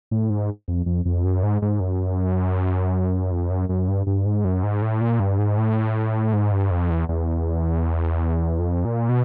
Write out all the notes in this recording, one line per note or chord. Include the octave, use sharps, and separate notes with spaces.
A2
G#2
F2
F2
F2
F#2
G#2
G#2
F#2
F2
F#2
F#2
G2
G2
G#2
F#2
G#2
A2
A#2
G2
G#2
A2
G#2
G2
F2
E2
E2
F2
A#2
B2